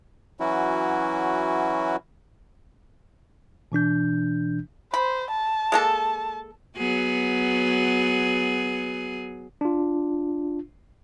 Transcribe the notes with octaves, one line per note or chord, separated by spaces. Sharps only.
E3 F#3 C#4 E4 F#4
B2 E3 D4 G6
C5 B5
A5
G#3 A#3 A4
F#3 B3 G#4
D4 F4